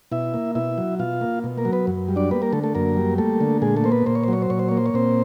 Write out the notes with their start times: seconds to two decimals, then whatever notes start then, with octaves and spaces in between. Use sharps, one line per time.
0.12 B2 E4 E5
0.34 A#3
0.55 B2 E4 E5
0.78 F#3
0.99 B2 F4 F5
1.21 A#3
1.44 B2
1.58 A#3 A#4
1.65 F#3
1.73 B3 B4
1.87 F#2
2.08 G3
2.16 D4 D5
2.31 A#3 B3 B4
2.42 A#3 A#4
2.53 D3 A3 A4
2.63 A3 A4
2.75 F#2 A#3 A#4
2.97 G3
3.18 A3 A#3 A4
3.41 D3
3.62 A#2 G#3 G#4
3.76 A3 A4
3.84 A#3 C5
3.92 B3 B4
4.06 A#2 C5
4.15 C#5
4.23 C5
4.28 F#3 C#5
4.42 C5
4.50 A#2 C#5
4.59 C5
4.69 A#3 C#5
4.77 C5
4.86 C#5
4.94 A#2 C4 C5